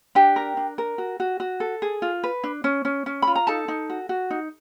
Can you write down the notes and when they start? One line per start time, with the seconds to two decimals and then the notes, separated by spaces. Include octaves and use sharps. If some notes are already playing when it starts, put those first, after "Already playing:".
0.15 D4 G4 G5
0.36 A#4
0.57 D4
0.78 A#4
0.98 F#4
1.20 F#4
1.40 F#4
1.60 A4
1.82 G#4
2.02 F4
2.24 B4
2.44 D4
2.64 C#4
2.85 C#4
3.06 C#4
3.22 F4 B5
3.35 A#5
3.47 D#4 A4 A5
3.68 D#4
3.90 F#4
4.09 F#4
4.30 D#4